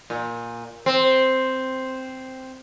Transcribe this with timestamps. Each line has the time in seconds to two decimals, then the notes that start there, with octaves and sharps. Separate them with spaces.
0.10 A#2
0.86 C4